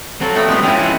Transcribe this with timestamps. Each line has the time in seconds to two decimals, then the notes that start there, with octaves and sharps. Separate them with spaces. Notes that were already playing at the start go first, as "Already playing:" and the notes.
0.21 F#3 C4 A4
0.36 G3 A3 B3
0.48 A#2 G3 G#3 B3
0.63 F3 C4 C#4 E4
0.79 E4 F#5